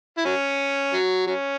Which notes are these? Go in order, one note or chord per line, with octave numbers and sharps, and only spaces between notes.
E4
F#3 C#4
F#3
F#3 C#4